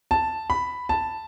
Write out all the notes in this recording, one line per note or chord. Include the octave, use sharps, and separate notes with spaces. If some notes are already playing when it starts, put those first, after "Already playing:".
A5
B5
A5